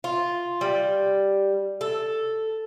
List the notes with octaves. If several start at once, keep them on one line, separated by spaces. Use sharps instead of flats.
F4
G3
A4